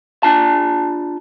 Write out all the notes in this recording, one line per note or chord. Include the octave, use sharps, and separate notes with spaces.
D4 F4 A5